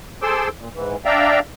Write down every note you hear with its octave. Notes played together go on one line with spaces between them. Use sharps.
G#4 A4 C5 C6 D6 E6
A#2
G#2 E3
D4 D5 E5 F5 G5 A#5